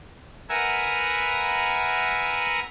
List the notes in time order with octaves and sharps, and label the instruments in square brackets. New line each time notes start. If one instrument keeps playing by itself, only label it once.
[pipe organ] A#4 B4 E5 F#5 G#5 A#5